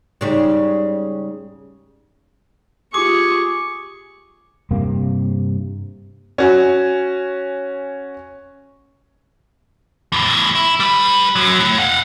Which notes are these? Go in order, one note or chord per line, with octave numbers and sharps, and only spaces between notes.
G#2 C#3 G3
F4 G4 G#4 C#6 D6
G2 C3 A#3
C#4 F#4 G#5
E2 A2
E4
G3 B4
F#2 F#3
A2
F5 F#5